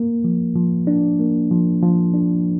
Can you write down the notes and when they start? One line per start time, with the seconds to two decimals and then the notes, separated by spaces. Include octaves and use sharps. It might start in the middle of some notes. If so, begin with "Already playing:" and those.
Already playing: A#3
0.24 F3
0.55 F3
0.87 D4
1.19 A#3
1.51 F3
1.83 F3
2.14 D4